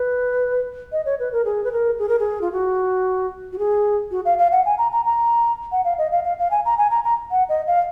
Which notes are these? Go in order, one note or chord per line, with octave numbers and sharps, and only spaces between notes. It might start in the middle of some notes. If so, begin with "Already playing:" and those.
Already playing: B4
D#5
C#5
B4
A#4
G#4
B4
A#4
G#4
A#4
G#4
F4
F#4
F#4
G#4
F#4
F5
F5
F#5
G#5
A#5
A#5
A#5
F#5
F5
D#5
F5
F5
F5
G#5
A#5
G#5
A#5
A#5
F#5
D#5
F5